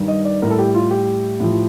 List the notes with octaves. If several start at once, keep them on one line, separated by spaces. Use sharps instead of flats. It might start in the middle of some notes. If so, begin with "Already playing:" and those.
Already playing: G2 D#3 G3
D#5
D5
A2 G3 A#4
A4
G4
F4
G4
A2 F3